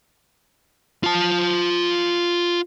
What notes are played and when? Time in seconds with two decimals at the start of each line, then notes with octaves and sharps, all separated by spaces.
1.03 F4 A5